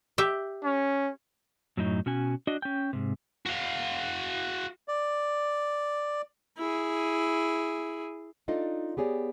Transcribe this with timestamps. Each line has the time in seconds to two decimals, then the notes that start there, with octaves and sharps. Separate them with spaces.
0.18 G4 E5
0.64 C#4
1.77 F#2 A2 F#3 D#4
2.06 B2 C#4 F#4 G#5
2.47 D4 F#4 D#5
2.62 C#4 G5
2.93 G#2 C3
3.46 F#4 F5
4.88 D5
6.58 E4 G#4
8.48 D4 D#4 F4 A4 D5 D#5
8.97 B3 G4 G#4 C#5 D5